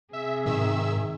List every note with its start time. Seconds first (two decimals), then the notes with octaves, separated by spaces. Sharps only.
0.13 C3 G#4 E5
0.46 G#2 D#3 E5 E6